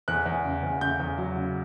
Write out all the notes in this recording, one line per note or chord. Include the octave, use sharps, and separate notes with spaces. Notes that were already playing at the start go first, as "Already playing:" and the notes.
E2 F#6
E2
C#3
E2
C#3 G6
E2
F#3
C#3